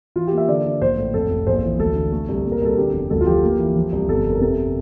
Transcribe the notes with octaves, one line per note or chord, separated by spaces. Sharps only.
E3 F4
G4
A#3
E5
D3 D5
D3
A#1 C5
A2
F2 A4
F1
A#1 C5
E3
D2 A4
D3
A3
C2
A#2
A#4
C2 A4
D3 G4
F1
D2 A4
F4
F3 G4
A#3
E3
F3
C2
G1 A4
F2
A#4
C3 A4